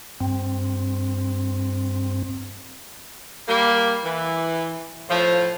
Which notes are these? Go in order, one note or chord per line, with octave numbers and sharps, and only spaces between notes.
G2 C4
G3 A#3
E3
A2 F3